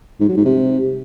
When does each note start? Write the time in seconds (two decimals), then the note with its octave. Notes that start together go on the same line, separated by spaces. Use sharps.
0.20 G#2
0.28 F#3
0.37 G#2
0.45 C3